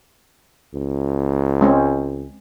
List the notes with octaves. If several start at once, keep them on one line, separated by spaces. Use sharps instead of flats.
C#2
G#3 C4 C#4